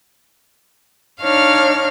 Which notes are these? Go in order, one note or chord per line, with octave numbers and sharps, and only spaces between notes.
D4 D#4 C#5 F5 F6